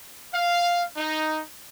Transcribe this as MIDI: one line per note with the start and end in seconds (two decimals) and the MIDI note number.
0.33 0.84 77
0.97 1.42 63